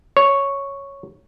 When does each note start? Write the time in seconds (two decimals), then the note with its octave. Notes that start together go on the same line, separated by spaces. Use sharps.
0.17 C#5